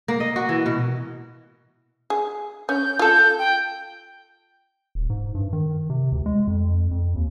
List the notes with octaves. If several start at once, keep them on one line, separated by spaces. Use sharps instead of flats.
A#3
D#5
F#4
E3
B2
G#4
C#4 G6
F4 A4 G6
G5
D#1
G#2
G2
D#3
C3
D2
G#3
F2
F2
D#2